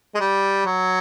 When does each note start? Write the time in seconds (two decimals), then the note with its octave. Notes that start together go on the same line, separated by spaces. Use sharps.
0.15 G#3
0.20 G3
0.66 F#3